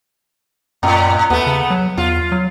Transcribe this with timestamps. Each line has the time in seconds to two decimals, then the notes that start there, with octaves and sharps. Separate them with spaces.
0.83 F#2 A2
1.30 D#2 A3 B3
1.47 C#3
1.70 F#3
1.98 E2 F4
2.32 F#3